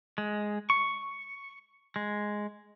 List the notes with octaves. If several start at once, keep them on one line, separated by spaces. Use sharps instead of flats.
G#3
C#6
G#3